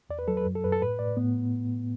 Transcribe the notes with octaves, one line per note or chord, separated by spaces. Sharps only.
E2 D5
B4
F#3 A4
B4
F#2
A4
F#2 B4
A4
A2 B4
A2 D5
A2 B3